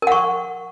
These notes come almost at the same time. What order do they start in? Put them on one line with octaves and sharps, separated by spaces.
A#4 F#5 C#6